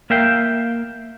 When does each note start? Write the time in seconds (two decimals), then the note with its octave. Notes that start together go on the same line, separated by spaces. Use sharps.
0.10 A#3 A#4 E5 F5 G5